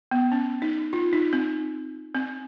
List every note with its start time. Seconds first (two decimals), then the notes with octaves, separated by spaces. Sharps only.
0.11 B3
0.32 C#4
0.62 D#4
0.93 F4
1.13 D#4
1.33 C4
2.15 C4